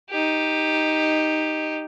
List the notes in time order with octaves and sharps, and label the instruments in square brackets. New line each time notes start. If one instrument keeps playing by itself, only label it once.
[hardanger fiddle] D#4 G4